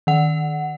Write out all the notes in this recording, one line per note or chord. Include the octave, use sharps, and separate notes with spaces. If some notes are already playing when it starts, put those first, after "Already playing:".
D#3 F#5